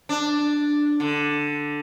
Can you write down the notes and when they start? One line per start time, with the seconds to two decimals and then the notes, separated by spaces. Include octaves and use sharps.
0.09 D4
1.00 D3